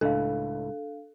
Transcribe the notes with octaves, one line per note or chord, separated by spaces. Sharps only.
C#2 A2 A3 D4 A4 F5